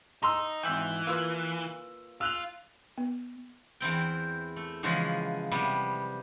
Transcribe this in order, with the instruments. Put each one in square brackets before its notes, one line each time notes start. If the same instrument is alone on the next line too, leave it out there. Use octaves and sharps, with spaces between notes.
[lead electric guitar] D#4 [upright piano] A#5 C6 E6
[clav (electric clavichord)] G#1 E5 G5 [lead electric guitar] E3
[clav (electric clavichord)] A#3 F4 B4 [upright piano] E6
[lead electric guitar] F4 [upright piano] E6 F#6 F7
[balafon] B3
[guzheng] E2 E3 C4 G5
A3
C#3 E3 F3 G#3 F#4 G#4
C3 G3 B3